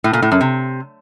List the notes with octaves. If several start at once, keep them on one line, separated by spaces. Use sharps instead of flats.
A2
A#2
A2
F#2
C3